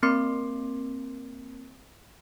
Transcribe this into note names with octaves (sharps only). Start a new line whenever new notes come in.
A#3 C4 A#4 C6 D6 C7